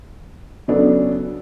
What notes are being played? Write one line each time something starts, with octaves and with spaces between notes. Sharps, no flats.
C#3 F#3 B3 D4 A4